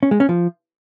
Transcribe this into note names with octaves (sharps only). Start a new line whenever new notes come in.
C#4
G#3
C#4
F3